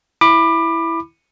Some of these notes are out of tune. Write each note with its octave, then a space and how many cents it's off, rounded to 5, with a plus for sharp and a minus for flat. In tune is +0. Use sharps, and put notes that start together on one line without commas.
E4 +0 B5 +0 D6 +25